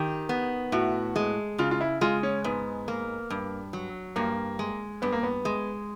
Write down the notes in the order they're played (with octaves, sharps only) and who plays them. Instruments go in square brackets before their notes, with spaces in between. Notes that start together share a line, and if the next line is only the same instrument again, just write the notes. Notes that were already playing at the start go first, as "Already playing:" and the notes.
Already playing: [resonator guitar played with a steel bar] D#3 [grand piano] G4
[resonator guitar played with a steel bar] B3
[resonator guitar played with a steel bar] A2 [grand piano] F#4
[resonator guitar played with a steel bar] G#3
[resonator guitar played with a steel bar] C#3 [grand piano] F4
[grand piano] F4
E4
[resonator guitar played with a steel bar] G#3 [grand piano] F4
[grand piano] C#4
[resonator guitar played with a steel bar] G#2 [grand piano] B3
[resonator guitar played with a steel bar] A#3
G2
F#3
[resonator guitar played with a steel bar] G2 [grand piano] A#3
[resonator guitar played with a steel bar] G#3
[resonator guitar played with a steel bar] G2 [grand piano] B3
[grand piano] A#3
B3
[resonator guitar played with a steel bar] G#3